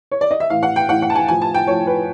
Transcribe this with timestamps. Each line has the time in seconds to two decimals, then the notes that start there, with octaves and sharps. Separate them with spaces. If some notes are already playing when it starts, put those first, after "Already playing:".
0.11 C#5
0.21 D5
0.31 D#5
0.40 E5
0.50 A2 E3 F5
0.63 F#5
0.76 G5
0.89 A2 E3 F#5
1.02 F#5
1.10 A5
1.15 G#5
1.28 A2 F3 G#5
1.42 A5
1.54 G5
1.67 A2 F3 C#5
1.87 B4